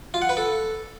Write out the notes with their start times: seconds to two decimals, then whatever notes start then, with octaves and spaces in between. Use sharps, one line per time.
0.14 F4
0.22 F#5
0.29 B4
0.37 A4